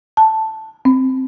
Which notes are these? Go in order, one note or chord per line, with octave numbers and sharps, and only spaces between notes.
A5
C4